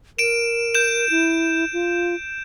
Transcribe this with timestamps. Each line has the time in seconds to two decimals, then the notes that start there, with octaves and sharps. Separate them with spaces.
0.19 A#4 D7 E7
0.74 G6 E7
1.10 E4
1.73 F4